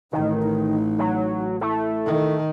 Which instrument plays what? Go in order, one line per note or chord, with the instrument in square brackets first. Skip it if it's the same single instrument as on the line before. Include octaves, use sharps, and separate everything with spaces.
[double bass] A1 [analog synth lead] D#3 [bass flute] D#4
[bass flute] D#4
[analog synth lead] F#3
[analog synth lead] A3 [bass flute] E4
[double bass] D#3